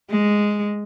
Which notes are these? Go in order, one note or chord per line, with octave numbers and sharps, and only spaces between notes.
G#3